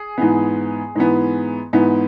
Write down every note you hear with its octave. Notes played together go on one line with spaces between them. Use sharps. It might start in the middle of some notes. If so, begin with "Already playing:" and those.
Already playing: G#4
G#2 E3 B3
G#2 E3 B3
G#2 E3 B3